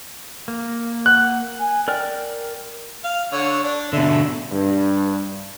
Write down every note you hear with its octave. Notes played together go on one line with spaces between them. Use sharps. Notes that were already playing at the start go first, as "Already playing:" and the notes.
A#3
F#5 F#6
G#5
A#4 D5 G5 F6
F5
D3 C#5
D4
B2 D3 E5
G2